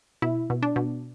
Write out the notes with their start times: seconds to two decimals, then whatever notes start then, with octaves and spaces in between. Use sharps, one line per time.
0.22 B2 E4
0.50 B2
0.62 D4
0.76 B2